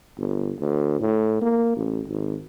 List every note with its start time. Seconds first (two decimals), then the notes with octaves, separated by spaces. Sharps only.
0.17 G1
0.60 D2
1.00 A2
1.41 A#3
1.76 A1
2.08 G#1